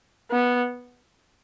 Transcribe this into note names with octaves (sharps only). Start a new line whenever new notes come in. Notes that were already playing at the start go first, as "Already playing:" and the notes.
B3